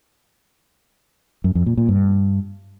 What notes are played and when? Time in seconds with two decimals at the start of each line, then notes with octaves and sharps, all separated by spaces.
1.44 F#2
1.55 F2
1.66 A#2
1.77 A#2
1.88 G2